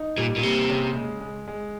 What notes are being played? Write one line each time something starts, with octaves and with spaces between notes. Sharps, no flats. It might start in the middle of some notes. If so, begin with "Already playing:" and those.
Already playing: D#4
A#2 G3
A#2
C3 A#3
C#3
G#3
G#3
G#3